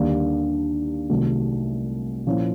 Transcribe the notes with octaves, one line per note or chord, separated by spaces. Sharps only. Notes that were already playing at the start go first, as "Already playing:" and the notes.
Already playing: D#2 D3 G3 A#3
C2 C3 D#3 F#3 A3
A#2 F3 A#3 C#4 E4